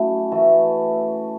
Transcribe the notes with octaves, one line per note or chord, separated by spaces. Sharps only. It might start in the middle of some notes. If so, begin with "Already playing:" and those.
Already playing: F#3 A3 C#4 E4
E3 A3 F#4 A4